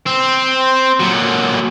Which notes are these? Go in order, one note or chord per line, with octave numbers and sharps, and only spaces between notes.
C4
A#2 F#3